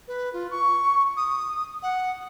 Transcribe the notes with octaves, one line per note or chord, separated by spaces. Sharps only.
B4
F4
C#6
D#6
F#5